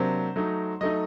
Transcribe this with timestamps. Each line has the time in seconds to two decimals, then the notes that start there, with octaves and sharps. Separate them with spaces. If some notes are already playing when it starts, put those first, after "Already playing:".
Already playing: C3 F#3 A#3 D4 C5
0.36 F#3 A3 D#4
0.81 F#3 A3 D#4 D#5